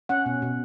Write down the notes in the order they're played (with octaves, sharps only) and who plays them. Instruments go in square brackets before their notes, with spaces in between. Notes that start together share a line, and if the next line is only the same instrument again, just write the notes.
[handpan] C#4 F#5
B2
B2